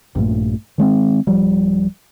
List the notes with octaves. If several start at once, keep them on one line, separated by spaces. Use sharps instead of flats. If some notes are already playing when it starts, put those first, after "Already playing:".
A#1 G2 A#2 A3
D#3 G#3 B3 C4
D1 F3 G3